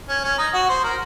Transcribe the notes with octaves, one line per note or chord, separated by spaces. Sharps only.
C#4
C#4
D#4
F#4
C5
A#4